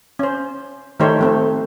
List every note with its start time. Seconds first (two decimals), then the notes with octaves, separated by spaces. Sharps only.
0.19 C#4 C5
1.00 D#3 A3 D#4 G4 C5 C#5
1.19 F3 A3 C4